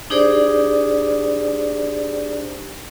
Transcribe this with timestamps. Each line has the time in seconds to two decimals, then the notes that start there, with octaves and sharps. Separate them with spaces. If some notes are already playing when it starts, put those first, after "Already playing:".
0.10 D4 D#4 G4 G#4 C5 D5